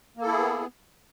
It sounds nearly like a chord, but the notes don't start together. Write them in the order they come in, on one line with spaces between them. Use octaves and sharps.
A#3 A4 E4 G#4 B3